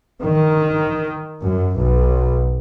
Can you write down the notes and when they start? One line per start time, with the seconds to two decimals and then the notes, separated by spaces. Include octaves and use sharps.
0.22 D#3
1.41 F#2
1.75 B1